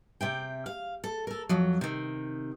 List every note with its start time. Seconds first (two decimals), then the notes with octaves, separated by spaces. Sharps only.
0.21 C3 E5 G5
0.66 F5
1.04 A4
1.27 A4 A#4
1.49 F2 F3 F#3
1.81 C3 D#3